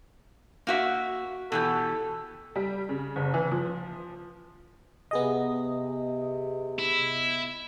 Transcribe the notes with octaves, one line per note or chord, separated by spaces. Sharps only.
A#3 F#4 E5
B2 E3 G4 A4
G3
C#3
F#1
E3
F3
C3 B3 G#4 D#5
E4